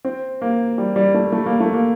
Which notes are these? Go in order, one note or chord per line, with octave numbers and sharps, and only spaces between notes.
C4
A#3
G3
G3
A3
A3
A#3
A3
A#3